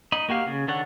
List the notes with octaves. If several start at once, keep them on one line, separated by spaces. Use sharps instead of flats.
D#4 D#5 B5
A#3 F#4 G4 F5
C#3
D#3 D4 A4 C#5 F#5